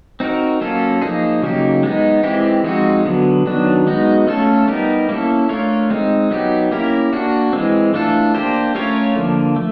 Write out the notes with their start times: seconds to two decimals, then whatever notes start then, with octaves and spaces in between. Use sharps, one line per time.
0.20 C4 D#4 F#4 A#4
0.61 F#3 A#3 C#4 F4 A4
1.02 F3 A#3 D#4 G#4
1.43 C#3 F#3 A#3 D#4 G4
1.83 G#3 B3 D#4
2.24 E3 G#3 C4 E4 G4
2.64 F3 G#3 C4 D#4 F#4
3.05 D3 F#3 B3
3.46 D#3 F#3 B3 D4
3.87 G#3 B3 D#4 F#4
4.27 A3 C#4 F4 A4
4.68 G3 B3 D#4 G4 A#4
5.09 A#3 C#4 E4 A4
5.49 A3 D4 F4 A#4 C#5
5.90 G#3 C4 D#4
6.31 F#3 B3 D#4 G4
6.72 A#3 C#4 E4 G4 A#4
7.13 A#3 D4 F#4
7.53 E3 G#3 C4
7.94 E3 A3 D4 F4 A4
8.35 A#3 D4 G4 C5
8.75 A3 C#4 F4 A#4 C#5
9.16 D3 F3 A#3
9.56 A3